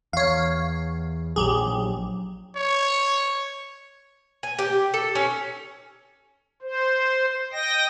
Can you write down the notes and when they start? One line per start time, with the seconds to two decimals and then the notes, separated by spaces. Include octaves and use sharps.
0.13 E2 C#5 F5
1.36 A#1 F#3 G4 G#4
2.56 C#5
4.43 G#5
4.59 G4
4.94 A4
5.15 C#4
6.62 C5
7.52 D#5 G5 A#6